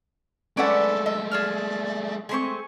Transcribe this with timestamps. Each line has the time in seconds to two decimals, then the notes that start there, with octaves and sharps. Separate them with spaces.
0.57 G#3 A3 C#4 A4 B4 D5 F#5 D6
1.06 D#5 E5
1.31 G#4 D5 E5 F6
2.29 G#3 A3 C4 G#5 C6 C#6